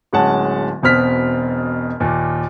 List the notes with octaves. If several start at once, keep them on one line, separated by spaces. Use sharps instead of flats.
D1 G#3 C#4 F#5 A5
E1 B2 C4 F6 B6
D#2 A#2